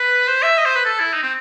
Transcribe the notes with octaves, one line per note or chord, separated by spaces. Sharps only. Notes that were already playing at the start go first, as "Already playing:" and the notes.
Already playing: B4
C5
E5
D#5
C5
B4
A4
E4
D#4
C4